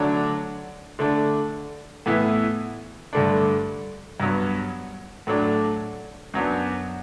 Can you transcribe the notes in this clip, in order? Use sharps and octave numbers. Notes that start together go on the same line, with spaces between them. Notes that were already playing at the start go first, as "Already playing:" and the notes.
Already playing: D3 F#3 A3 D4
D3 A3 D4
A2 E3 B3 E4
G2 D3 A3 D4
G2 F#3 B3
A2 F#3 A3 D4
F#2 F#3 B3 D4